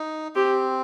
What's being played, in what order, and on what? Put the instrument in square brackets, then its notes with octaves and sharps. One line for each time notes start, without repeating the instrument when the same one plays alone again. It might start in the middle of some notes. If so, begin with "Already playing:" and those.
Already playing: [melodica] D#4
[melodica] C4 [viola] G4